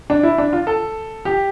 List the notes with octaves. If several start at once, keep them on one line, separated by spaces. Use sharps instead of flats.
D4
E4
D4
F4
A4
G4